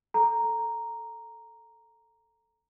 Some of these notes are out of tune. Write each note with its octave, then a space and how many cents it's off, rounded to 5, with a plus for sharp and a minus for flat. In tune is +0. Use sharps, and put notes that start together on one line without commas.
A4 +0 A#5 +0